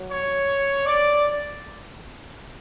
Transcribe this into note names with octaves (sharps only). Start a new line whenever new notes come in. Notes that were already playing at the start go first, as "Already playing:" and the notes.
Already playing: F#3
C#5
D5